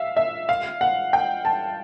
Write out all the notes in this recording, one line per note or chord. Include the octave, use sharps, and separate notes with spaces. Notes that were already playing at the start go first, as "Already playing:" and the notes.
Already playing: E5 F5
E5
F5
F#5
G5
A5